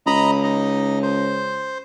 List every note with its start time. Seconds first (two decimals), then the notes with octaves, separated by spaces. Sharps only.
0.06 C#2 D#5 A#5 B5
0.43 D#4 D#5
1.03 C5